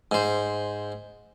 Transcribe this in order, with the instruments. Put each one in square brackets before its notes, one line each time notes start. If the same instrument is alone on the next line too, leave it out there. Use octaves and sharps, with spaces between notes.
[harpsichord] G#2 C5